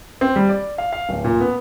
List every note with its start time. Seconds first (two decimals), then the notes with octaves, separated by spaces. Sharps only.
0.21 C4
0.36 G3
0.49 D5
0.78 F5
0.93 F5
1.09 D1
1.24 A#2
1.40 B3